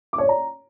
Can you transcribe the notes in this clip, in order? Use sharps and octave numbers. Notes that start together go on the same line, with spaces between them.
D6
C#5
D5
A#5